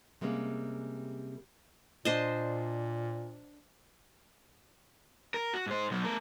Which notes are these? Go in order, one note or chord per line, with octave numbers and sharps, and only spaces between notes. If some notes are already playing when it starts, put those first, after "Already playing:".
C3 G3 G#3 A#3 C#4
A#2 D4 C5 D#5
A#4
F#4
G#2 C5
B2 F#3
A3 A#4